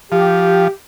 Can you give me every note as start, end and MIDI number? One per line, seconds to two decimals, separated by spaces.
0.12 0.68 53
0.12 0.70 67